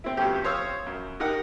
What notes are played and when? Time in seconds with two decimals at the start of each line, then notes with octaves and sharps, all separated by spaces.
0.04 C4 E4
0.17 F2 B2 A3 C#4 G4
0.44 C5 C#5 F5 D#6 E6
0.86 F#2
1.20 D#4 G4 A#4 F#5